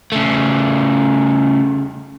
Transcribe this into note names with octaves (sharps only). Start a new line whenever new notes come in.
C#3 A3